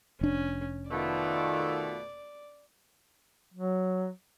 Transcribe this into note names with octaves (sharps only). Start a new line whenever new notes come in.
F1 C#4 D4
B2 D#3 A3 F4 D5
F#3